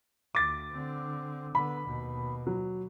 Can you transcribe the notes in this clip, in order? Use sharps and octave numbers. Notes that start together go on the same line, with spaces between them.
D2 D6 A6
D3 C4
D3 B3 B5
D#2 B2
F#3